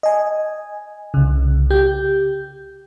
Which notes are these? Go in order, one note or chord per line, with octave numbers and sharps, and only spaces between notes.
D#5 G#5
C2 C#3
G4 G6